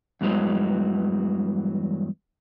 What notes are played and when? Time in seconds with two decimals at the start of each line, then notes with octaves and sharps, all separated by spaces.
0.21 E2 G2 E3 F#3 G#3